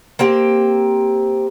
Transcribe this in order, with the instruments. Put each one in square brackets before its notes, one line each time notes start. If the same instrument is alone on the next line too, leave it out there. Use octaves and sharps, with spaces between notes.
[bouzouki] A#3 C4 G4